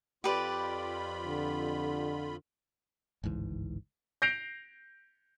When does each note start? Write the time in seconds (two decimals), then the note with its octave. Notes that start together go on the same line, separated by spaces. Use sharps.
0.24 F2 F4 G4 B4 D5 B5
1.27 D3
3.24 G1 C#2 G#2 E3
4.22 G6 A#6 C7 D7 F7